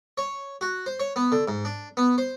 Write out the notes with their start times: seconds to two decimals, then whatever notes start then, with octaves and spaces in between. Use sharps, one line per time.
0.18 C#5
0.61 F#4
0.86 C5
1.00 C#5
1.16 B3
1.32 D3
1.48 G#2
1.65 D4
1.97 B3
2.18 C5